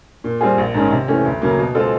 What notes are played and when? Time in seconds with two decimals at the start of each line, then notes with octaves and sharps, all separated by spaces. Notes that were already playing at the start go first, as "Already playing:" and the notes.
0.24 A#2
0.41 G3 C4 F4 G#4
0.58 A#1
0.74 G#2 D#3 G#3 C#4
0.91 C3
1.08 E3 A3 C#4
1.25 D2
1.42 C#3 F#3 A#3
1.59 B2
1.75 G#3 C4 F4 A4